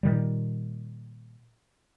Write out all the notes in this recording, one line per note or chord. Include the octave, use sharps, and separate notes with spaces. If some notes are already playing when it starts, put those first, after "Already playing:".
A#2 D#3 G3